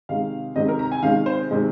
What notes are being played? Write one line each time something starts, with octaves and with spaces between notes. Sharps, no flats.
C3 D#3 G#3 F5
C3 D#3 G#3 D#5
A#4
A#5
G#5
C3 D#3 G#3 F5
C5
C3 D#3 G#3